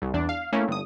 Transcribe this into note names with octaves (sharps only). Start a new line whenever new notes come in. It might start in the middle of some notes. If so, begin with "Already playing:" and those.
C2
E2 D4
F5
A3 A#3 C#4 E4
G1 D#6